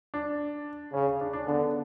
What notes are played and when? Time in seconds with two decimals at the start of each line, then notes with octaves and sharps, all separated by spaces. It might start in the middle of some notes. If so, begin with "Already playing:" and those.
0.14 D4
0.93 C#3 C#4
1.06 C#4
1.21 D4
1.33 D4
1.47 D3 B3